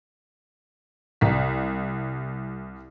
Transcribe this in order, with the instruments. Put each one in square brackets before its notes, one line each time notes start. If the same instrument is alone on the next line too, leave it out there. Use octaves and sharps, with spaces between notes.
[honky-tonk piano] C2 B6